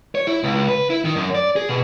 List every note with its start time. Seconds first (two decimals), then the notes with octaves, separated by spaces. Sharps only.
0.15 C#5
0.27 E4
0.43 C#2
0.68 B4
0.90 E4
1.05 D#3
1.16 F#2
1.35 D5
1.56 G#4
1.69 B2